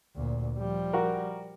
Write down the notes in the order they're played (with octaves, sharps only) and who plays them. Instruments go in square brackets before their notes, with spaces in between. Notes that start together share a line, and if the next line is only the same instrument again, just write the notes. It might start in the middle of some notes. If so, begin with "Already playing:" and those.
[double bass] D2 A#2
F3 G3
[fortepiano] F#4 A#4